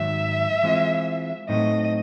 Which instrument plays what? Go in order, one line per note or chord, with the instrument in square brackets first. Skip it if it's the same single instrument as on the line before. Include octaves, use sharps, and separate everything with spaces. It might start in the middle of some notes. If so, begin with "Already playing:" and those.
Already playing: [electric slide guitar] G#2 D#3 F#3 [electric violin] E5
[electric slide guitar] E3 G#3 C4 F4
[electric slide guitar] A2 F#3 A3 C4 D#4 [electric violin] D#5